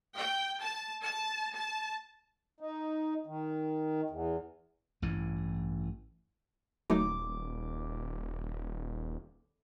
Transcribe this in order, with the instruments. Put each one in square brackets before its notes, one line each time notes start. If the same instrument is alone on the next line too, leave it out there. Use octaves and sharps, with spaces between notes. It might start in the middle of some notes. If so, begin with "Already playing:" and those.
[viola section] G5
A5
A5
A5
[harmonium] D#4
D#3
E2
[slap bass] A1 G2 E3
[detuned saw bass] D#1 [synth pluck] F#3 A3 D#4 [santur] D6